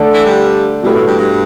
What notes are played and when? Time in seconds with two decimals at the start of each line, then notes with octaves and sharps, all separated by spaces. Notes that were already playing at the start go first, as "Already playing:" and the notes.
Already playing: D3 A3 D4 A4
0.12 E3 E4
0.24 G2 G3
0.82 G2 B2 G3 A3 E4 B4
0.94 A2
1.05 G2
1.18 G2